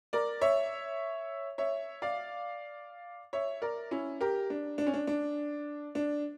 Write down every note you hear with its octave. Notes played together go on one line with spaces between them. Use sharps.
A#4 D5
C#5 E5
C#5 E5
D5 F5
C#5 E5
A#4 D5
C#4 E4
G4 A#4
D4
D4
C#4
D4
D4
D4